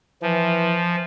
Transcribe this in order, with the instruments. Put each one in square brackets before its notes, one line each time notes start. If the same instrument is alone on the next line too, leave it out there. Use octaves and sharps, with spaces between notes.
[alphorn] E3 [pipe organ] F3